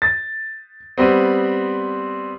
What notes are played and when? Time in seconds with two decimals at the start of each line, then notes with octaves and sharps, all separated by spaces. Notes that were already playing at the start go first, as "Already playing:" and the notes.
0.02 A6
0.98 G3 B3 C4